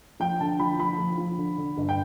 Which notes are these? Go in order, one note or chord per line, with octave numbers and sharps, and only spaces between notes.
F3 G5
D3 A5
F3 B5
F3 B5
F3
F3
D3
D3
G1
G5